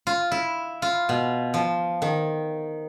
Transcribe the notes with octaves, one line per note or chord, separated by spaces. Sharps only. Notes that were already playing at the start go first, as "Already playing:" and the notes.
F4
E4
F4
B2
F3
D#3